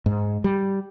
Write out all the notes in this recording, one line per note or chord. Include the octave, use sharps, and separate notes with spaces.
G#2
G3